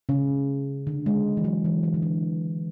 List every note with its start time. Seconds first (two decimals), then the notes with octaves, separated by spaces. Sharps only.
0.09 C#3
0.87 D3
1.06 G#3
1.37 E3
1.44 F#3
1.65 E3
1.83 E3
1.94 D3
2.02 E3